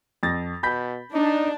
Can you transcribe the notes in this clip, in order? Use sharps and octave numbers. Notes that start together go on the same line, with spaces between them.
F2 A6 A#6
B2 B5 G6 B6
D4 D#4